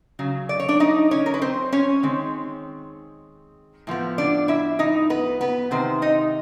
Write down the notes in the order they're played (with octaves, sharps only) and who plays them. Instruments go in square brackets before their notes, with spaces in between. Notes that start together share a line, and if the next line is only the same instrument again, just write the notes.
[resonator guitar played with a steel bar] C#3 F#3
D5
C#5
D4 D5
D#4 D#5
C#4 C#5
A#4
B4
C4 C5
C#4 C#5
D#3 G#3 C4
A2 F3 B3
D4 D5
E4 E5
D#4 D#5
B3 B4
B3 B4
C3 D#3 C5
D#4 D#5